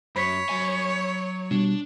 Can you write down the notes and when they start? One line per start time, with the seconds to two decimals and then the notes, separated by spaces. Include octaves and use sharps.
0.16 F#2 C#5 B5 B6
0.49 F#3 G#5
1.51 B2 G3 D4